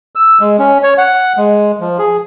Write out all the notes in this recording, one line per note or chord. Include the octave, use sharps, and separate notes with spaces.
E6
G#3
C#4
C#5
F#5
G#3
F3
G#4